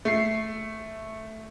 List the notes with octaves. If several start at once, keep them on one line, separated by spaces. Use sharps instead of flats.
A3 C7